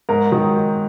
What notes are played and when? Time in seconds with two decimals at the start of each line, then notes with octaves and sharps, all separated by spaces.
0.09 G#2 A#4
0.32 D#3 F#3